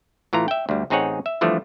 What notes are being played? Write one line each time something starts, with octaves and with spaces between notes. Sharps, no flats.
A2 E3 F4 A#5
E5 G5
D2 G3
A1 C4 D#4 G#4 C#5 F#5
E5
D3 E3 F3 G3 A3